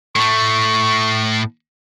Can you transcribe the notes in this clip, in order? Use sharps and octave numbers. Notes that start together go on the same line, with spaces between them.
A2 A3 C#6